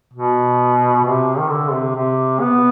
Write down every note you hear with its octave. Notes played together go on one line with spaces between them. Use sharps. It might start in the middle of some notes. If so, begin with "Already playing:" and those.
B2
C3
D#3
D3
C3
C3
B3